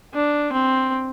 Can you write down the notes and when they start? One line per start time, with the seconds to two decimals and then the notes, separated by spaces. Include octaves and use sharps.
0.14 D4
0.53 C4